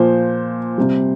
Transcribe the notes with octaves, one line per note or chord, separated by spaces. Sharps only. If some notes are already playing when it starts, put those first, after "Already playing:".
Already playing: A#2 F3 C5
C3 G3